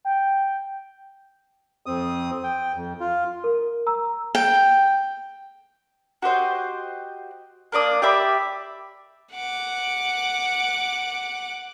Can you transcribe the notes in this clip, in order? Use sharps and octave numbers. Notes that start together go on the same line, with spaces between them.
G5
F2 C4 D#6
G5
F2
F4
A#4
A#5 E6
G5
F#4 G4 C5 D#5
A#3 D4 D5 D#6
G4 D5 E5 B5
F#5 D6